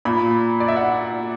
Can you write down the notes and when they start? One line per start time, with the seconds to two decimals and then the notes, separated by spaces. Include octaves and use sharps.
0.05 A#2 B5
0.60 D5
0.68 E5
0.76 F#5